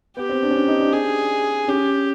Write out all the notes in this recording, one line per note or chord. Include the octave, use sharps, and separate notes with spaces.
B3 G4
C4
D4
C#4
D4
D#4
D4
G#4
C#4 G4